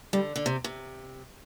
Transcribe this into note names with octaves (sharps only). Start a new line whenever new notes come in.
D3 G3
D3
C3
C3